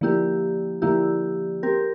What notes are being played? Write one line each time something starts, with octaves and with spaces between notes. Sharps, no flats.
D3 F3 A#3 E4 G4
D3 F3 A#3 E4 G4
C4 G4 A#4